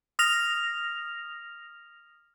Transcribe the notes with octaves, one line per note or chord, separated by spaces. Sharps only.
D#6 F6 A#6 F7